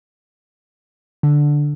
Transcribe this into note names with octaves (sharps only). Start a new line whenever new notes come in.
D3